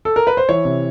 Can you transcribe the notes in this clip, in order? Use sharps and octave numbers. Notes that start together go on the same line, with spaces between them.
A4
A#4
B4
C5
E3 C#5
C3